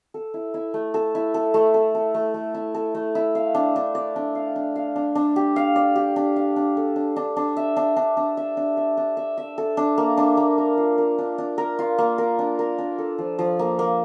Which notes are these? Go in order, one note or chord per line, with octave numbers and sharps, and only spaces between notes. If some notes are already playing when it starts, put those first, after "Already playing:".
A4
E4
E4
A3
A4
E4
A4
A3
A4
A4
A3
A3
E4
A4
A3
E4
F5
D4
D4
D5
D4
F5
D4
F5
D4
D4
G4
F5
D5
G4
D4
F5
D4
A4
D4
D4
D4
E5
D4
D4
D4
E5
D4
E5
D4
E5
E5
A4
D4
A#3
D4
A#3
A#4
F4
A#4
D4
D4
A#4
F4
A#3
A#4
D4
A#4
D4
A4
F3
F3
A#3
A#3